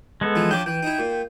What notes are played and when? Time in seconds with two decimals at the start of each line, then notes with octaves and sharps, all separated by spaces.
0.21 G#3 B3 A4
0.35 E3 F3
0.51 F3 C#4 D4 G5 D6
0.66 E3 G5
0.83 D#4 E4
0.99 A#2